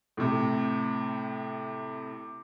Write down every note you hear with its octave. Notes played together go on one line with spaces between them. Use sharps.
A2 C3